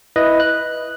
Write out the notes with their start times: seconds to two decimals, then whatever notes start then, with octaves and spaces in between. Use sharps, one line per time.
0.16 E4 B4 D#5
0.40 F#6